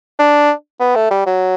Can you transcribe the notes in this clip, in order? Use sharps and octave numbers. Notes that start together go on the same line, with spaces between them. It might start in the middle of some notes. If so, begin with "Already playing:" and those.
D4
B3
A3
G3
F#3